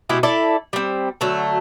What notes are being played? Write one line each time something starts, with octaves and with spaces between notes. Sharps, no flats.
B2 G#3 E4 G4
E4 A4 D5
G3 C4
D3 F#3 A3